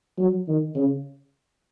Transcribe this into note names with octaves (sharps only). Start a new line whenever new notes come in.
F#3
D#3
C#3